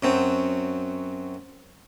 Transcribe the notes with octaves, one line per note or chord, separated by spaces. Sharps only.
F#2 F#3 C4